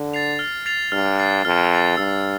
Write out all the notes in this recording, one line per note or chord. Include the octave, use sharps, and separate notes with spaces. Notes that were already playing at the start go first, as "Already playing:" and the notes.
Already playing: D3
A6 C7 F7
F6
A6 C7 F7
G2 F6
A6 C7
F2 F6
A6 C7
G2 E6